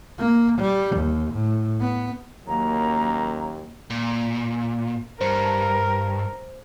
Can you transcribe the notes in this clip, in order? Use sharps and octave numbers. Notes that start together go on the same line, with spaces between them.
A#3
G3
D#2
A2
B3
D#2 F#3 A#3 C#4 A#5
A#2
G2 A#4 C5